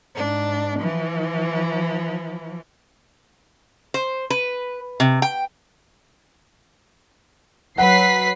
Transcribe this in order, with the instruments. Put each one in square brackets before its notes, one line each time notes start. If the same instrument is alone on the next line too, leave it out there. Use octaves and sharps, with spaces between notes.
[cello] G#2 D4
E3 F3
[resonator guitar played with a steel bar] C5
B4
C3
G5
[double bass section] F#3 [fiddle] B4 [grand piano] F#5 [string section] B6 C7